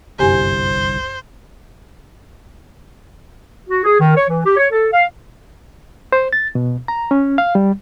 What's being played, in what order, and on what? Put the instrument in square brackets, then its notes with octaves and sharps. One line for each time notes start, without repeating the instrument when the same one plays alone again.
[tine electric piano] G1 C2 [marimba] F#2 G4 G#5 [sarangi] C5
[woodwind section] F#4
G#4
D#3
C#5
E3
G4
C#5
A4
F5
[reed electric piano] C5
A6
B2
A#5
C#4
F5
G3